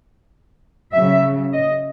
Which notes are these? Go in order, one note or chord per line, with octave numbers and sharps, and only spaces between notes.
C#3 F#3 E5
D#5